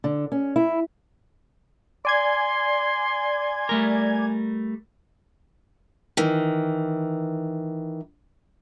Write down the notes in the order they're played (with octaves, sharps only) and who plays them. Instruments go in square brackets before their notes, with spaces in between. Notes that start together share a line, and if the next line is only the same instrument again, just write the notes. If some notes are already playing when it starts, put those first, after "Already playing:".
[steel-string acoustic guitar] D3
C#4
E4
[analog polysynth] D5 G#5 G#6 [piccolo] C6
[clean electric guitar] G3 A3 A#4
[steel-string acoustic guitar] D#3 E3